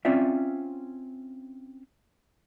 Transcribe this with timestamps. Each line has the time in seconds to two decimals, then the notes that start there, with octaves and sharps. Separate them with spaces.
0.05 C4 C#4 F4 D5 E5